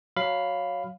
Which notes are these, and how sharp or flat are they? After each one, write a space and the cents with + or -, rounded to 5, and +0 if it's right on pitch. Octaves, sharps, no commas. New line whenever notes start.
F#3 +0 F5 +0 B5 +10